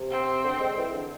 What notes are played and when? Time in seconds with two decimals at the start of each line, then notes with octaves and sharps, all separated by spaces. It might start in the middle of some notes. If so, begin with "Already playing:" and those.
Already playing: C3
0.11 C4
0.44 D3
0.60 G#3
0.77 E3
0.93 D3